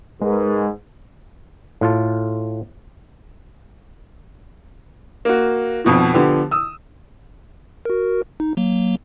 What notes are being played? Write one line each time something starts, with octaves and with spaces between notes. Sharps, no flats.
G#2 G#3 G#4 A#4 B4
A2 F4 A5
A#3 F#4
G#1 F2 B2 F3
D3 F3 B3 G4
D#6 E6
F#4 A#4
D#4
F#3 A#3